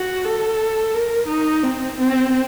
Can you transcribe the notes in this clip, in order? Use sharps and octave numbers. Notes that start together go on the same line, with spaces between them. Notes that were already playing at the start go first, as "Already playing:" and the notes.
Already playing: F#4
A4
A#4
D#4
C4
C4